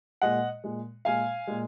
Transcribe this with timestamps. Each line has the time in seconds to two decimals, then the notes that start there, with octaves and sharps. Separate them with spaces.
0.22 A#2 G#3 D#5 F#5
0.64 A#2 G#3
1.05 A#2 G#3 F5 G#5
1.47 A#2 G#3